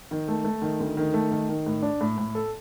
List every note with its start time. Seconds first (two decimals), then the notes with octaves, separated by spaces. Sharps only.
0.11 D#3
0.28 A3
0.44 A3
0.62 D#3
0.80 D2
0.97 D#3
1.14 A3
1.31 D#3
1.49 D#3
1.66 A2
1.83 D4
2.01 A2
2.18 A2
2.35 A4